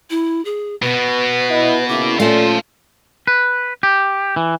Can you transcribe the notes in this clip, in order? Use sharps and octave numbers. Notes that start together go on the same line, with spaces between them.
E4
G#4
B2 B3 B4
E4 D#5
C#3 A#3 E4 D6
A#2 A3 C#4 F4 A4 D5 F5 A5
B4
G4
E3